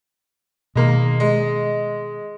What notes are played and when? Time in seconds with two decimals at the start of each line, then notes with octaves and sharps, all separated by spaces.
0.75 B2 D#3 G#3 A#3
1.20 G#3